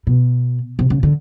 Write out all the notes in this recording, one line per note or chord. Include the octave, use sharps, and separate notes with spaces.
B2
C3
C#3
D3